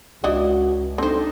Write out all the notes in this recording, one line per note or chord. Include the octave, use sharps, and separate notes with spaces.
C#2 D4 E4 F#4 D#5
C4 D4 D#4 A4 C5